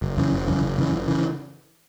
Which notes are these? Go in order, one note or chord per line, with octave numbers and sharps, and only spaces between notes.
F#1
F#2 C#3 E3
F#1
F#2 C#3 E3
F#1
F#2 C#3 E3
F#1
C#3 E3